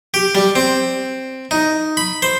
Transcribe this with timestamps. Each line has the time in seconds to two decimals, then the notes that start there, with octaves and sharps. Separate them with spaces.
0.14 G4
0.35 G3
0.55 C4
1.51 D#4
1.97 B5
2.22 C5